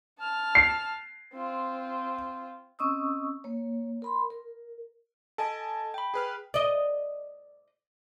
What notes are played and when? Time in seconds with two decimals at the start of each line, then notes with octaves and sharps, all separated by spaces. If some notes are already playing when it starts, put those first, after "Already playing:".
0.19 A5 F6
0.55 C7
1.34 C4 F4
2.79 C4 C#4 D#5 C#6 D#6 E6
3.44 A#3 C#5
4.02 A#4 B5 C6
4.30 A#4
5.38 A4 D#5 G#5 A5
5.94 G5 B5
6.14 G#4 B4 F6
6.54 D5 D#5